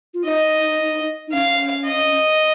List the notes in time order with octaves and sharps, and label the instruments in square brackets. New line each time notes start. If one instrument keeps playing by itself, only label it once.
[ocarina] F4
[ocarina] D#4 [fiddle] D#5
[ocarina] D#4
[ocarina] C#4 [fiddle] F5
[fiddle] D#5